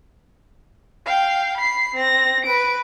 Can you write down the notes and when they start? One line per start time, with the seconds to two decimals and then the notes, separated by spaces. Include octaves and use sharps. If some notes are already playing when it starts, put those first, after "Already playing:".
1.06 F5 G5
1.57 B5 C7
1.95 C4 A#6
2.45 B4 D7